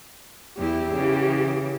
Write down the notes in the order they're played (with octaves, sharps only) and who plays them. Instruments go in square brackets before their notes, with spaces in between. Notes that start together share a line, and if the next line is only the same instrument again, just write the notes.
[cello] E2 E4 [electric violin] G4
[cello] C#3 E3